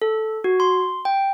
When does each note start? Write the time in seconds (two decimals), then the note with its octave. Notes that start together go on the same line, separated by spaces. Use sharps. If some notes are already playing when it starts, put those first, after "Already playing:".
0.02 A4
0.44 F#4
0.60 C6
1.05 G5